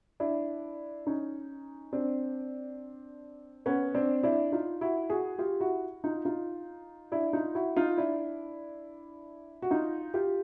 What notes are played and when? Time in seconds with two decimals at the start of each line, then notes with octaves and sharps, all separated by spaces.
0.20 D4 E4
1.07 C#4 D#4
1.93 C4 D4
3.66 B3 C#4
3.95 C4 D4
4.23 D4 E4
4.52 D#4 F4
4.81 E4 F#4
5.10 F#4 G#4
5.39 F4 G4
5.60 E4 F#4
6.04 D#4 F4
6.25 D#4 F4
7.12 D4 E4
7.33 D#4 F4
7.55 E4 F#4
7.76 D#4 F4
7.98 D4 E4
9.62 F#4
9.71 D#4 F4
10.14 F4 G4